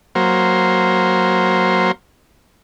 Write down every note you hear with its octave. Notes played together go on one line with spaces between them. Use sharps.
F#3 A#3 C5